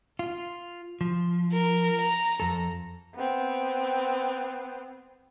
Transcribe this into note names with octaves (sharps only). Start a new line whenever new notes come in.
F4
F3
A#4
A#5
F2 A4
B3 C4